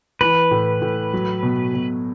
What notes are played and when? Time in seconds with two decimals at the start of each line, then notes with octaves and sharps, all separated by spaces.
0.21 E3 B4
0.51 A2
0.82 A2
1.13 F#3
1.43 B2
1.74 B2